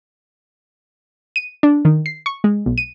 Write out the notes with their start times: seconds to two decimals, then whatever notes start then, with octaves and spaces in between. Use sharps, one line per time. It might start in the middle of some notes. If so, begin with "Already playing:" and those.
1.36 D#7
1.63 D4
1.85 D#3
2.06 C7
2.26 C#6
2.44 G#3
2.66 B1
2.78 D#7